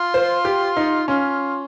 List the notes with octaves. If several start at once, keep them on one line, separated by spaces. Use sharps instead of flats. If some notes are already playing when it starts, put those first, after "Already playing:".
Already playing: F4
C5
G4
D#4
C#4 F4